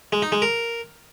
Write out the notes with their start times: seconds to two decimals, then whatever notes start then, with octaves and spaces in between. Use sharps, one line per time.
0.12 G#3
0.22 D#4
0.32 G#3
0.42 A#4